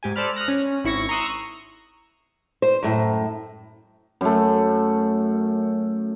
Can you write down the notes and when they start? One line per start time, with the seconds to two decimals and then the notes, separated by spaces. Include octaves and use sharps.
0.03 G#2 G4 G#5
0.16 A4 C5 D5 B5 F6
0.36 D#6 F6 F#6 A#6
0.48 C#4
0.84 G#1 E4 C#6 A#6 C#7
1.09 A#5 C6 C#6 D#6 E6 F#6
2.62 C5
2.83 F#2 A2
4.21 F#2 A3